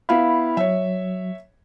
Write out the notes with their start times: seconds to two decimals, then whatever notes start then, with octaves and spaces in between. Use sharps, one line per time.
0.09 B3 E4 F5 B5
0.57 F#3 C#5 E5